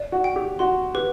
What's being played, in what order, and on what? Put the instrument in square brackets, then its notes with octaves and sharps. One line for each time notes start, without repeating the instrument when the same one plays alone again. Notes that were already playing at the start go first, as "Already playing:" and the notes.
Already playing: [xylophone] D5
[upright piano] F#4
[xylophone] G5
[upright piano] G4
[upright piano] F#4 [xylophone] C6
[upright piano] G4 [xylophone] B4